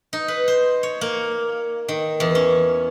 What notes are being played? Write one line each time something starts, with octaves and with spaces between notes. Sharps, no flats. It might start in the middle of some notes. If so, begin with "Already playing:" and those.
D#4
B4
C5
C#5
A#3
D#3
E2
C#4